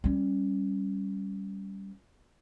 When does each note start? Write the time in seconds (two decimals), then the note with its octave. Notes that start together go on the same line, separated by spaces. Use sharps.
0.04 G3 C#4